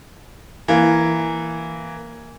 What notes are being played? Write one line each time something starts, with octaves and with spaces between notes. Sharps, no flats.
E3 A#3